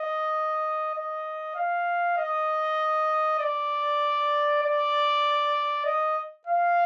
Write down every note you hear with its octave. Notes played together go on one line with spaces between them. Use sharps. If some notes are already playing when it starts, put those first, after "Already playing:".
Already playing: D#5
D#5
F5
D#5
D5
D5
D#5
F5